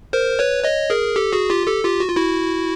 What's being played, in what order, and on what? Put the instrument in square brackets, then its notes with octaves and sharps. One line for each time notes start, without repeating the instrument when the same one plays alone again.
[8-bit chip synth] A#4 C5
B4 C#5
C#5 D#5
G#4 A#4
G4 A4
F#4 G#4
F4 G4
G4 A4
F4 G4
F#4
F4
E4 F#4